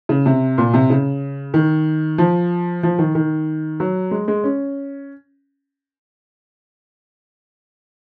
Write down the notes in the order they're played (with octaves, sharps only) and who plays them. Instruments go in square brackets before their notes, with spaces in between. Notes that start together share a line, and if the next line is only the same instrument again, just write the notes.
[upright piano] C#3
C3
A#2
C3
C#3
D#3
F3
F3
D#3
D#3
F#3
G#3
G#3
C#4